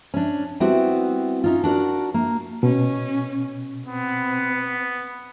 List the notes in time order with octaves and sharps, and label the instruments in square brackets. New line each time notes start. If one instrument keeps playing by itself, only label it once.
[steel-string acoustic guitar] C#4 D4
G3 B3 C4 E4 F#4
C#4 D#4 F4
D4 F#4 A#4 D5
A#3
[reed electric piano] B2 [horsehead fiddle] C#4
[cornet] B3 [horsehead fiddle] C4